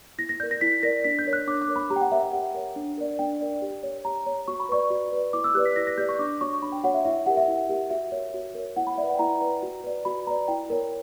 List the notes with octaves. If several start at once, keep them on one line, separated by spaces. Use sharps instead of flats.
E4 A#6
A#6
A#4 D5 G6
A#6
E4 B6
A#4 D5 A#6
D4 B6
G6
A#4 C#5
F#6
D4 D6
D6
A#4 C#5
B5
G4 A#5
G5
F#5
A#4 C#5 E5
E5
G4 F#5
A#4 C#5
D4
A#4 D5
D4 G5
A#4 D5
G4
C#5
G4 A#5
C#5
F#4 C#6
B5
B4 D5 C#6
F#4
B4 D5
E4 D6
E6
G4 B4 D5 F#6
B6
E4 A#6
A#6
G4 B4 D5 G6
C#6
D4 D6
F#4 C#5 C#6
D4 B5
G5
F#4 C#5 F#5
E5
E4 E5
G4 A#4 F#5
E5
E4
G4 A#4
F#4 E5
A#4 C#5
F#4
A#4 C#5
E4 F#5
B5
B4 D5 E5
F#5
G5
E4 A#5
B4 D5
F#4
B4 D5
F#4 B5
B4 D5 A#5
E4 G5
A#4 C#5